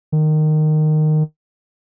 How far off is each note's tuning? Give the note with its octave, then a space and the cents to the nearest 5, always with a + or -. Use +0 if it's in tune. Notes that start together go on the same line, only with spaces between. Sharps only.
D#3 -15